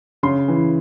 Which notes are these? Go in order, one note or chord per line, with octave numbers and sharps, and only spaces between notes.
C#3 C6
E3